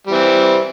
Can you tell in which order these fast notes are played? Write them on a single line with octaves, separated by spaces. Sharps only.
G3 E3 C4